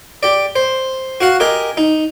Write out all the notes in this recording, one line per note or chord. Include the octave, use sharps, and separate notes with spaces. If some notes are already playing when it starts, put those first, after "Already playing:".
G4 D5
C5
F#4 F5 F#5
G4 A#4 D#5 G#5
D#4